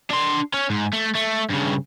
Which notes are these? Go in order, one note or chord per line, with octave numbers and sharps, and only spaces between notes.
D4 C6
C#4
G#2
A3
A3
G2 C#3